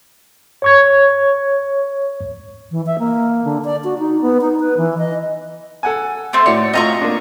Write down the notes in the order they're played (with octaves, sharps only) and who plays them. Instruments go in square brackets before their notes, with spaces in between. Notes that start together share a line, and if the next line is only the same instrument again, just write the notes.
[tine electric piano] C#5 C#6 G#6
[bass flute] E3
E5
A#3
D3
D5
F#4
D#4
B3
D#4
B4
E3
D#5
[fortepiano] A4 F#5 G#5
[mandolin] A3 C4
[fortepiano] A2 F#4 D5 [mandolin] C#5
[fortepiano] A3 C4 F4 [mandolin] D#5 A#5 C#6
[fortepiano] A#3 D4